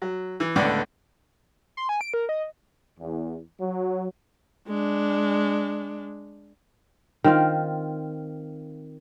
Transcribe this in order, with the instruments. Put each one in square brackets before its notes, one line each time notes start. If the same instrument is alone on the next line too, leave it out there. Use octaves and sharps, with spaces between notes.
[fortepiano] F#3
E3
C#2 A2 D3 A3 B3 D5
[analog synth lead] C6
G#5
D7
A#4
D#5
[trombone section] E2
F#3
[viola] G#3 D4
[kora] D#3 C4 F4